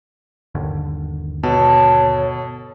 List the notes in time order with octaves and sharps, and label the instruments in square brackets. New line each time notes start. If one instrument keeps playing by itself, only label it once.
[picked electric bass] G1 D#2 D3
[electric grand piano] B2 [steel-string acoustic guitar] A4 [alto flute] C#5